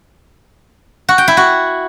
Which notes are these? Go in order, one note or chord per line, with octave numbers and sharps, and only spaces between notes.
F#4
G5
E4
F#4